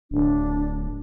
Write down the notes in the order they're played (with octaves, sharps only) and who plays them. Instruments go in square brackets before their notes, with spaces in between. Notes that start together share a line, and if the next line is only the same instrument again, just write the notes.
[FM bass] D1 [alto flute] D4